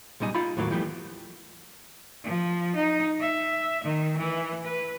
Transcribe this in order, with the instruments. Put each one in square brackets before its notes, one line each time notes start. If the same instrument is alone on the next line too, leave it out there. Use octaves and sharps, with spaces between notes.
[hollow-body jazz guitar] B1 A#2 G3 D#4 G#5
D#4 F4 B5
D#2 A2 F#3 A#3
E3 F3 G3 A3 B3
[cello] F3
D#4
E5
D#3
E3
B4